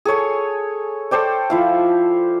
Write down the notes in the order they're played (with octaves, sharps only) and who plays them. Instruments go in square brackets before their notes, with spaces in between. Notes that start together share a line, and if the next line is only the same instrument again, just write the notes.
[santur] G#4 A4 C#5 G#5
A4 C5 D5 G5
F3 E4 F5